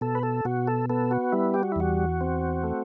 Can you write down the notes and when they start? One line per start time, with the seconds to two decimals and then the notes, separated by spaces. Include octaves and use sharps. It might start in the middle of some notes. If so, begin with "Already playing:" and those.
0.01 B2 A4
0.15 B4
0.23 A4
0.45 B2 F#4
0.67 A4
0.89 B3 A4
1.11 F#4
1.32 G3 E4
1.54 G4
1.63 F#4
1.72 E4
1.76 E2 F#4
2.21 C4
2.64 A3